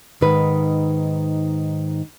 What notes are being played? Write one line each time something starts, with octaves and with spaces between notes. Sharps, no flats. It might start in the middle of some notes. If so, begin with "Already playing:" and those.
G#2 D#3 B4